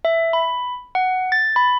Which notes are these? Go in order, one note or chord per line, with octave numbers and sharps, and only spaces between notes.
E5
B5
F#5
A6
B5